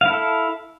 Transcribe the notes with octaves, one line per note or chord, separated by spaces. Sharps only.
E4 A4 F5